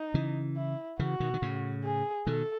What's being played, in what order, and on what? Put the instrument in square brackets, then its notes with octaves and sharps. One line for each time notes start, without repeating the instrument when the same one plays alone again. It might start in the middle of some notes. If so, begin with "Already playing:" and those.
Already playing: [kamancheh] D#4
[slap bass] C#3 E3
[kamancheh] E4
[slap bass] C#3 E3 [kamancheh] F#4
[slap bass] B2 D#3
D#3
A2 C#3
[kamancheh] G#4
[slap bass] B2 D#3 [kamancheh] A4